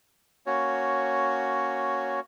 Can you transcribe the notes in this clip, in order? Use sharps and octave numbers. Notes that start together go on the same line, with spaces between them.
A#3 C#4 F#4 C#5